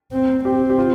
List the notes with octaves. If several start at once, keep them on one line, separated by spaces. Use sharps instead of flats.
C4
C4 G4
G4
F4